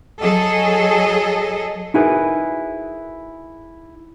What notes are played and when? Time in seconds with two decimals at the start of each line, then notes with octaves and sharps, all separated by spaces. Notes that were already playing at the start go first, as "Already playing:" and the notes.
0.21 F#3 G#4 A4 D#5
1.94 D#4 E4 F#4 G#4 A#4 B4